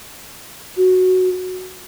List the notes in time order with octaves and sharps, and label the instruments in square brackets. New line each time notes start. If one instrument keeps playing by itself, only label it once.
[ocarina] F#4